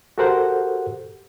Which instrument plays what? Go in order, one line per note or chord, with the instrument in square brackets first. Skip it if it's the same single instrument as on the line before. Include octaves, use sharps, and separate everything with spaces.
[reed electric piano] F#4 G4 A4 A#4 C5 F#5